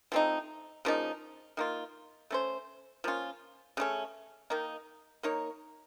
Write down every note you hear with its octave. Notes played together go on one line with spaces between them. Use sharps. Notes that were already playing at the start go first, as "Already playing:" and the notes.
F3 A3 C4 D#4
C#3 F3 A#3 D#4
D#3 A#3 F4
A3 C#4 A4 C5
F3 A#3 C#4 F4
C#3 A3 C#4
D#3 A#3 D#4
A#3 D#4 A#4 C#5